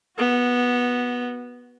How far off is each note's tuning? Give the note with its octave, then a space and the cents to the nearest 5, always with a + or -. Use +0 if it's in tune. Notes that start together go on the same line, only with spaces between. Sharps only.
B3 -10 F#4 +10